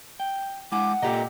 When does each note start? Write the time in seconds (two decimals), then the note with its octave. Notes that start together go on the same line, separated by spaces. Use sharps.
0.20 G5
0.72 G#3 E4 F#5 G#5 D6
1.02 A#2 G4 A4 A#4 D#5 A#5